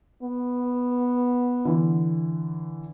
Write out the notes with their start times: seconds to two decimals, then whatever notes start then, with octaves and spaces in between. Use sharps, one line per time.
0.23 B3
1.65 D3 E3